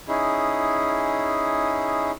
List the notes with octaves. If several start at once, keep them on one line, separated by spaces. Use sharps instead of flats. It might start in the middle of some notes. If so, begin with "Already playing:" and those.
C#4 D#4 E4 G#4